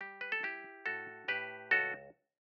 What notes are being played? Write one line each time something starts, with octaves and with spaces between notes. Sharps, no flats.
G3 G4
B4
A4
E4 G4
A2 F#4 A4
A2 G4 B4
C#2 F#4 A4